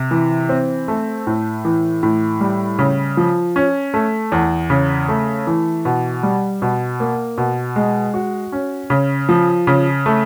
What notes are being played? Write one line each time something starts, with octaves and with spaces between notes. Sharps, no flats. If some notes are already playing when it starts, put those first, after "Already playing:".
Already playing: C3
E3
C4
A3
A2
E3
A2
G3
C#3
F3
C#4
A3
E2
C#3
A3
E3
B2
G3
B2
A#3
B2
G#3
F#4
C#4
C#3
F3
C#3
A3